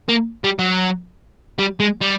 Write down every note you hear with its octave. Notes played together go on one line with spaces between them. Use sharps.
A#3
G3
F#3
G3
G#3
G3